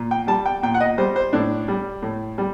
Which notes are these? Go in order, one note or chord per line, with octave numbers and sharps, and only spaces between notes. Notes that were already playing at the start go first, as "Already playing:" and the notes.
Already playing: A#2
G5
G3 A5
G5
A#2 G5
F#5
D#5
G3 C5
C5
A2 D4
G3
A2
G3